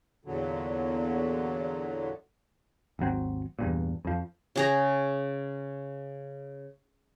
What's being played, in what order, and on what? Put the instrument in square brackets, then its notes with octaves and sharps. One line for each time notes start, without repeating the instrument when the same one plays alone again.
[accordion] E2 A#2 D3 F#3
[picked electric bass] G#1 D#2 F#3 C4
E2 G2 A#2
F2 F3
[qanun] C#3 G#4 A#5